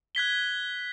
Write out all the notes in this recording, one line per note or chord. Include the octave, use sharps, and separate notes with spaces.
F#6 G#6 B6 G7